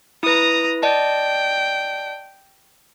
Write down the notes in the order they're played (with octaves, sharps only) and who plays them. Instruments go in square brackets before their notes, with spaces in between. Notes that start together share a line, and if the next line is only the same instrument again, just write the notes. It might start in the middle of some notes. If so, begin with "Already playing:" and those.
[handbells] E4 B4 [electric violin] A#5 D#6
[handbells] D5 D#5 A5 [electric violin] G5